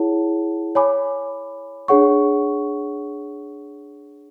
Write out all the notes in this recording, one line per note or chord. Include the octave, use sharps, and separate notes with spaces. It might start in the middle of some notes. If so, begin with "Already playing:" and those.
Already playing: E4 G#4 C#5 F#5 A5
C#5 G#5 B5 D6
D4 G#4 C#5 F#5 C#6